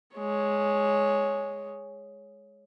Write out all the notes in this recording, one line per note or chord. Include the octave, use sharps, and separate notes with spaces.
G#3 C#5